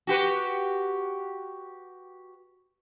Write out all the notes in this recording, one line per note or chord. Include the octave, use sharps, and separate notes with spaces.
F#4 G4 B4